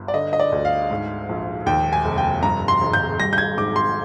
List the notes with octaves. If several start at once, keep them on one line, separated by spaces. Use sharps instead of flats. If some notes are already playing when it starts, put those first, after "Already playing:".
Already playing: G1 G2
D5
D3 D#5
D#5
D5
D2
F5
G#2
A#1
D#2 G5
G#5
F1
G5
G2 A#5
C6
G#1
G6
G3 A#6
G6
G#6
G#2 D6
C6